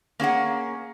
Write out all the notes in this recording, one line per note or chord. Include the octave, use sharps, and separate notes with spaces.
A#3 C#4 G#4 F#5